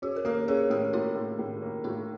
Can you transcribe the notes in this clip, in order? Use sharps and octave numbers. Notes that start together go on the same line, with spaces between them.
C#4 F#4 G#4
A#4
A#3 G4 A4
C#4 G#4 A#4
A2 G4 A4
A#3 E4 F#4
A2
A2
A#3
A2 D#4 F4